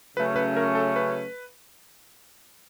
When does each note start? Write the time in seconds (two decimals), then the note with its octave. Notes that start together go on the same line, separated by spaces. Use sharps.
0.16 C#3 F#3 A3 C#4 B4
0.36 B4
0.56 A#4
0.75 A4
0.96 B4